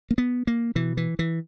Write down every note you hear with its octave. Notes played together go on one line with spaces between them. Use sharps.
A#3
B3
A#3
B2 E3
E3
E3